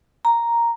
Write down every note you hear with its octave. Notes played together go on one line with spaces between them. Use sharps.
A#5